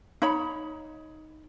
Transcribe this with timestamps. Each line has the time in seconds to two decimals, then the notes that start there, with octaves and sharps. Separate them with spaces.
0.22 D#4 C#5 B5